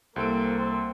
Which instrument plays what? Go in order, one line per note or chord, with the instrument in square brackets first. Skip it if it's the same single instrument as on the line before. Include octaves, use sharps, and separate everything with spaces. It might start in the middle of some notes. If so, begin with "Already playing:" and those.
[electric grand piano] C2 A4 D7 [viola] A#3 [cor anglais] C4
[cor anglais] C4